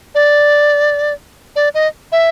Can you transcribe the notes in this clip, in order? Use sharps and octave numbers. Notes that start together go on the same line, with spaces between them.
D5
D5
D#5
E5